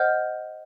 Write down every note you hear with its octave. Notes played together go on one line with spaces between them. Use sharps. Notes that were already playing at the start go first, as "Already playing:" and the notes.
Already playing: C5 D#5 F#5 F6 G6